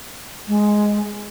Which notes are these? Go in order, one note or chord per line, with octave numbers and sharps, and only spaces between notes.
G#3